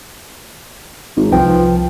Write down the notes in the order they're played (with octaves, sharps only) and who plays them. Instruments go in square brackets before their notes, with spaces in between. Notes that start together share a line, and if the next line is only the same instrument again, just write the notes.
[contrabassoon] G#1
[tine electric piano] C2 B4 G5 [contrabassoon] F3